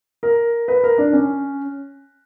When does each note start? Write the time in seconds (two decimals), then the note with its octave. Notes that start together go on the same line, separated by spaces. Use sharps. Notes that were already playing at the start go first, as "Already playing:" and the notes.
0.23 A#4
0.68 B4
0.84 A#4
0.98 D4
1.13 C#4